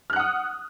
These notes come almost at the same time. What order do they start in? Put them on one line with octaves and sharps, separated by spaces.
F6 F#6 F#5 D#6